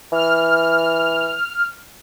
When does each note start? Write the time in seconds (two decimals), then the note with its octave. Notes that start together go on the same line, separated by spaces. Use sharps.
0.12 E3 F6